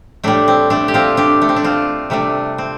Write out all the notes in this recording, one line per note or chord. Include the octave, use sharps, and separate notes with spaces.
A2 G3 A3 D4
C4
A3 D4
G4
C4 F4
D4 G4
A3
C4
D4
C4 F4
C3 G3 A3 D4
C4